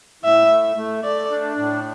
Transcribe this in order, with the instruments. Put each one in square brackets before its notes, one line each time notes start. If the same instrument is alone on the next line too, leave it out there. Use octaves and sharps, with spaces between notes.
[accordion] A2 [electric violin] E5
[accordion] A3
A3
[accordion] A3 [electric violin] D5
[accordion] D4
A2